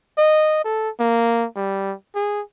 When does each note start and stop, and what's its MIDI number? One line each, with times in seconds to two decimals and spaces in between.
0.18 0.61 75
0.64 0.89 69
1.00 1.46 58
1.55 1.94 55
2.15 2.42 68